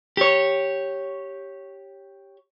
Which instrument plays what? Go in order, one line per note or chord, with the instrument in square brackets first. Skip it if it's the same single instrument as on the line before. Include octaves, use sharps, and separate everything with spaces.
[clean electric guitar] G4 C#5